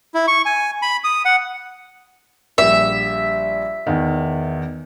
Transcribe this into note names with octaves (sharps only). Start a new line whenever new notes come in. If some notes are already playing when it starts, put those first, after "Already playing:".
E4
C#6
G#5
B5
D#6
F#5
A#1 G3 E5
E2 D#3